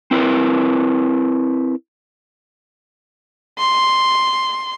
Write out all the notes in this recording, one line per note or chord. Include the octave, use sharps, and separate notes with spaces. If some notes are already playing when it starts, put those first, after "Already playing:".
C4 E4 A#4 B4
C6